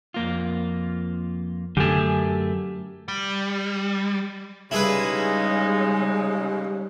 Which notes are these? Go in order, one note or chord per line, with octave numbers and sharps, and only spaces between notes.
F2 A#3 F4
F#2 D3 A3 G4 G#5
G3
C#3 G3 G#3 D#4 E4 G#4 B4